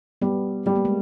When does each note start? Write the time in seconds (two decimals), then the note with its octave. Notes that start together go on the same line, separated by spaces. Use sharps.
0.22 G3 B3
0.66 G3 B3
0.76 A#3
0.85 G#3